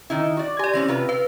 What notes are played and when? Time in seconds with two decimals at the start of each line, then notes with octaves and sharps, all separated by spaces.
0.10 D#3 D#4 E4
0.37 F#4 D5
0.59 G4 D5 G#5
0.73 E3 C4 C#4 A#6
0.88 C3 F4 B4
1.09 B4 F5